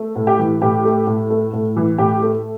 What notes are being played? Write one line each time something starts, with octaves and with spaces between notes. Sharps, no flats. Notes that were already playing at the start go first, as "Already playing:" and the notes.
Already playing: A3
A2
G4
E3
A2 G4
A3
A2
A3
A2
E3
A2 G4
A3